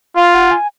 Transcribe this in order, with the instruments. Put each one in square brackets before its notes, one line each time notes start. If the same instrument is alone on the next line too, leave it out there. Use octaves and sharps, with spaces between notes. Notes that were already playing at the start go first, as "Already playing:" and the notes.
[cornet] F4 [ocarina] F5
[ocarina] F#5
G#5